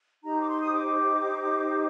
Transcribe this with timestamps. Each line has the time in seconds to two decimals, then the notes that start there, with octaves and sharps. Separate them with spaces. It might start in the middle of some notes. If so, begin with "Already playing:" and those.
0.23 D#4 G4 C5 A#5
0.41 D6
0.48 C6
0.61 D#6
0.73 D6